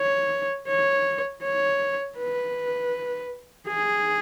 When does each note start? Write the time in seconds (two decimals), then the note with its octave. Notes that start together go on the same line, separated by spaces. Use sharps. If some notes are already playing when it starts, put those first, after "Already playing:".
Already playing: C#5
0.68 C#5
1.43 C#5
2.18 B4
3.68 G#4